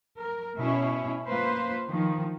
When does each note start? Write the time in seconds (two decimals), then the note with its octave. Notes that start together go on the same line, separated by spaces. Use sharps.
0.17 A#4
0.58 B2 C#4 E4 C#5
1.27 A#3 F4 B4 C5
1.88 D#3 F3